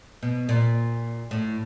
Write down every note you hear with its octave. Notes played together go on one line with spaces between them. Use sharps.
B2
A#2
A2